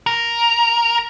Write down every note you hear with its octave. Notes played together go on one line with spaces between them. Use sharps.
A#4